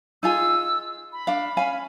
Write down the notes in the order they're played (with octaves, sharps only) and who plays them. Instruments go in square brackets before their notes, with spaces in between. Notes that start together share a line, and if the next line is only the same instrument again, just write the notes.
[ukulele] D#4 F4 G#4 [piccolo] E6
[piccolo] B5
[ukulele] D4 F5
C#4 F5 G#5